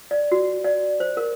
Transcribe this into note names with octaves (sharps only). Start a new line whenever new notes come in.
D5
F#4
D5
C5
A#4